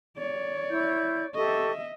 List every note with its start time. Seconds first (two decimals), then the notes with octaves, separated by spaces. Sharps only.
0.18 C#5 D5
0.70 E4 G6
1.35 G4 A4 D#5 E5 C#6